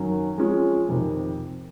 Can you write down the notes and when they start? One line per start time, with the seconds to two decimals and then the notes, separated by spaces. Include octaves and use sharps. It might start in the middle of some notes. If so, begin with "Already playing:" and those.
Already playing: F#2 D#3 F#3 C#4
0.38 F3 G#3 C#4 F4
0.89 F2 C3 D#3